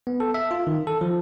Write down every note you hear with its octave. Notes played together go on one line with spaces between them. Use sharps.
B3
A4
E5
F4
D#3
A4
F3